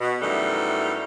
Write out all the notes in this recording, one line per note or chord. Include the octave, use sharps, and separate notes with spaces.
B2
F#2 E3 G3 A3 D#4